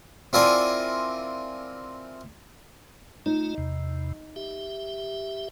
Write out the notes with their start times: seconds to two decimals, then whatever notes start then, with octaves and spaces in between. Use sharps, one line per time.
0.33 C4 E4 F4 A#4 D5 G#5
3.26 A3 D#4 F4 D#5
3.58 E2 C3
4.36 G4 E5